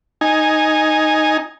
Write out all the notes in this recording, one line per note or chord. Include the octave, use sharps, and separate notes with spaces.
D#4 G#5